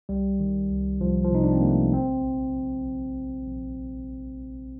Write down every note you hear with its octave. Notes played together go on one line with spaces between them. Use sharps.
C2 G3
D#3
C2
C2 F3
F3
C3 D#4
D4
C4
C3 A#3
A3
A#1 C4
A#1
A#1
A#1
A#1
A#1